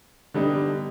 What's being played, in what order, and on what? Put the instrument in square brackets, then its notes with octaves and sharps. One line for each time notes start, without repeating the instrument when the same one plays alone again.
[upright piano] D3 G3 B3 D#4